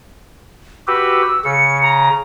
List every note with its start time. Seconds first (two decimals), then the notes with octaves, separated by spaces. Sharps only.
0.87 F#4 G4 B4 E6
1.45 C#3 C#7
1.82 A#5